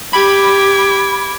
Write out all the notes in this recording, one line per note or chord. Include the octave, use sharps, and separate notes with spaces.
G4 B5 D6 G#6